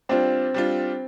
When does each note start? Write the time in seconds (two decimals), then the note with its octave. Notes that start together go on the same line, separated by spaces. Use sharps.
0.09 G3 C4 D4 F4
0.54 G3 D4 F4